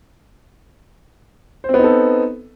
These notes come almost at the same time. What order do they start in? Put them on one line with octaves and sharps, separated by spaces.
C5 C4 B3 D#4 A4